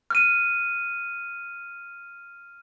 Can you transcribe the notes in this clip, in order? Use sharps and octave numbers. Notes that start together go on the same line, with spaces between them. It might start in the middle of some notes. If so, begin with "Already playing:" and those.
F6 D#7